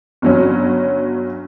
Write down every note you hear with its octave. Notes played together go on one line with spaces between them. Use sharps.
G1 F#3 C#4